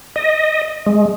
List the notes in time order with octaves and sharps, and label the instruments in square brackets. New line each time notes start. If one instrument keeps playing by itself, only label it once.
[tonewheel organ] D#5
G#3